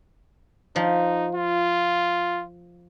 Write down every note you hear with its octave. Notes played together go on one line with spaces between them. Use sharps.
F3 D#4
F4